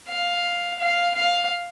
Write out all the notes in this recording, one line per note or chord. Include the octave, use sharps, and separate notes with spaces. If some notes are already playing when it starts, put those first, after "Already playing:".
F5
F5
F5